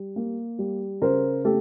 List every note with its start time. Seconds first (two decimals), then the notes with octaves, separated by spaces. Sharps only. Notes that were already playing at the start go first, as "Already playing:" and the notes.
Already playing: G3
0.16 A#3
0.59 G3
1.02 C#3 A#4 C5
1.45 A3 G4 A4